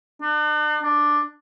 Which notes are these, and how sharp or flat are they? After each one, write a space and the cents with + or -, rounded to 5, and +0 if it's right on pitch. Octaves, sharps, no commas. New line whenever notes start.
D4 +45
D4 +5